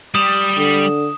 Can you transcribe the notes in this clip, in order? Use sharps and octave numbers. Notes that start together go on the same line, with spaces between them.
G3 D#6 E7
D3